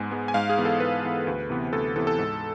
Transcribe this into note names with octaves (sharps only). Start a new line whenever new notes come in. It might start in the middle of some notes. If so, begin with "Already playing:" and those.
Already playing: G#2 G#3 B3 G#5
G#3 B3
G#5
G#2 F5
G#4
E3 B3
A4
G#2 B4
E3 B3
D2
C3 E3 B3
D2 A4
C3 E3 B3 A4
A4
G#2